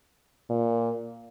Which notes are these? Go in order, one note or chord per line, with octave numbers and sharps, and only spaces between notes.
A#2